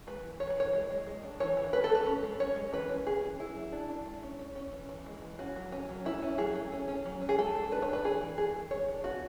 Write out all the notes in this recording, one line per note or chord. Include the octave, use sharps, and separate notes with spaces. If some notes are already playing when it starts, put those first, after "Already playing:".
G#3 B4
E3
E3 C#5
B4
E3 C#5
G#3
G#3
G#3
D4
E3 C#5
E3
A3 B4
A4
A3
B4
C#4
G#3
C#4 C#5
G#3
E3 B4
C#4
C#4 G#4
E3
F#3 E4
F#3
D4
D4
G#3
C#4
C#4
C#4
E3
E3
G#3
E3
C#4 F#4
F#3
C#4
F#3
A3 E4
C#4
F#3 G#4
A3
C#4
C#4
F#3
C#4
G#4
G#3 A4
G#3
D4 B4
C#5
D4 B4
E3 G#4
E3
A3 G#4
E3
G#3 C#5
D4
B3 F#4